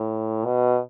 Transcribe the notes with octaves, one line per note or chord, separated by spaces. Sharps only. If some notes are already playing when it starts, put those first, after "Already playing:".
Already playing: A2
B2